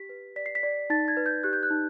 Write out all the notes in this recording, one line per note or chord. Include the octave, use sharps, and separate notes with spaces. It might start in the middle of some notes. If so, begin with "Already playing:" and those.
Already playing: G4 B6
B4
D5 B6
C7
B6
D5
D#4 A6
G#6
B4
G6
G4 F#6
G6
F#6
D#4